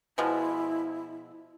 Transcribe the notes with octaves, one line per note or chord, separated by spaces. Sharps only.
B2 F3 G#3 E4